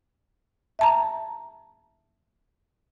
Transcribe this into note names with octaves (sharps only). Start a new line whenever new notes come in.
E5 A5 A#5